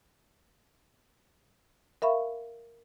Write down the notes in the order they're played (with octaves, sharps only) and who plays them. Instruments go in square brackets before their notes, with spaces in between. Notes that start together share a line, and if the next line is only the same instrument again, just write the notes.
[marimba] A#4 E5 F5 B5 C#6